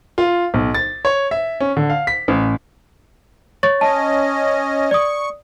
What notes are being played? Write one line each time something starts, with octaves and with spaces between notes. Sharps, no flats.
F4
B1
A6
C#5
E5
C#4
D3
F5
B6
A1
C#5 C#6 A6
C#4 D#5 A5
D5 C#6 D#6